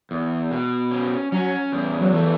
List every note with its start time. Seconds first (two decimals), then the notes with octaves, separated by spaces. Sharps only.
0.11 E2
0.51 B2
0.91 C#4
1.32 F#3 C#4
1.72 E2
2.01 F#3
2.13 E3 A3